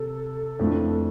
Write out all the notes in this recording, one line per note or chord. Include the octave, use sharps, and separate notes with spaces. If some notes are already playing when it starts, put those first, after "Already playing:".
Already playing: C3 A4
F2 E3 A3 D4 F4